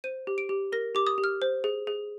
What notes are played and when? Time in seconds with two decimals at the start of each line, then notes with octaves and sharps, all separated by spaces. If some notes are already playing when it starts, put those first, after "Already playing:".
0.04 C5 D#7
0.27 G4
0.38 D7
0.49 G4
0.72 A#4 A#6
0.95 G4 D6
1.07 D#6
1.18 G4
1.24 F6
1.42 C5
1.64 G#4
1.87 G#4